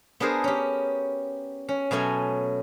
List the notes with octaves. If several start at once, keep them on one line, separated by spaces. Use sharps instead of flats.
B3 D4 G#4 A#4 C5
C#4 G4
C#4
B2 F#3 A3 C#4 G#5